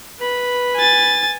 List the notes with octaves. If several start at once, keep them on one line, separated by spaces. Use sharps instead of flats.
B4 B5
G#5 A6